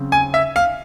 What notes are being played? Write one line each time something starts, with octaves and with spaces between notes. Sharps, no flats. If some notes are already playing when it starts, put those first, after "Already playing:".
Already playing: C#3 F#3 C4
G#5
E5
F5